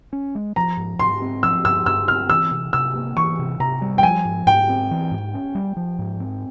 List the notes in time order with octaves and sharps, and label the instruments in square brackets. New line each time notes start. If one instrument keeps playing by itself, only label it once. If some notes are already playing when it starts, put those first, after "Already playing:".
[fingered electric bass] C#4
G#3
[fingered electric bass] F3 [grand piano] A#5
[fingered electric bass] G#2
[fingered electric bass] G#2 [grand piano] C6
[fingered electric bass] C4
[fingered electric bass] F3 [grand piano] E6
[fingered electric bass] G2 [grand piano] E6
[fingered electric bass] G2 [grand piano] E6
[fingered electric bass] C4 [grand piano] F6
[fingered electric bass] E3 [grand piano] E6
[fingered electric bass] C3
[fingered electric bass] C3 [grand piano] E6
[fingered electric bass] A#3
[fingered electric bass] E3 [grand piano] C#6
[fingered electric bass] C3
[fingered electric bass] C3 [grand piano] A#5
[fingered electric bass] G3
[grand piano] G5
[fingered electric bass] F3 [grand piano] G#5
[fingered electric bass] G#2
[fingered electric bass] G#2 [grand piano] G5
[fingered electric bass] C4
E3
G#2
C#4
G3
F3
G#2
C4